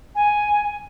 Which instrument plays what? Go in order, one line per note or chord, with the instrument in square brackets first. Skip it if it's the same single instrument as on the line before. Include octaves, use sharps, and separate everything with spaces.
[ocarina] G#5